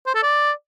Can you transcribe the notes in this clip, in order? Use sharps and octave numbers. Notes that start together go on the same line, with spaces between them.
C5
A4
D5